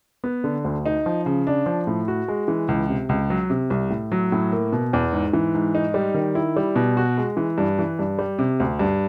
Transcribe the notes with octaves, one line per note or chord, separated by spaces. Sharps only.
B3
D3
D2
D#4
F3
C#3
D4
F3
A2
F#4
G#3
E3
C#2
C3
C#2
F#3
C3
C2
A2
F#3
A2
A#3
B2
E2
G#2
E3
G#2
D#4
G3
D#3
E4
G3
B2
F#4
G#3
E3
G2
E3
G2
G3
C3
D2
G2